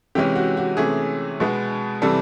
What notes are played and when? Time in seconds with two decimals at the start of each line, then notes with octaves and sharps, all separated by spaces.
0.15 C3 E3 G#3 C#4 G4
0.35 F#4
0.57 F#4
0.77 C3 E3 A3 C#4 G#4
1.40 B2 G#3 B3
2.02 C3 E3 G3 A4